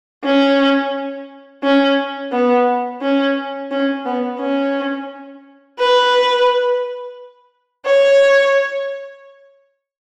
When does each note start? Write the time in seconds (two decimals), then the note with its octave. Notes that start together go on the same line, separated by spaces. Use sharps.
0.24 C#4
1.63 C#4
2.32 B3
3.02 C#4
3.71 C#4
4.06 B3
4.40 C#4
5.79 B4
7.86 C#5